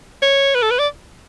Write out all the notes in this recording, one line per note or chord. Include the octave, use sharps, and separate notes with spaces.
C#5
B4
A4
B4
D5